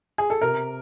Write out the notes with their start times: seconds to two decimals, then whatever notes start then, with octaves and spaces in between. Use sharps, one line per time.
0.18 G#4
0.30 A4
0.42 C3 A#4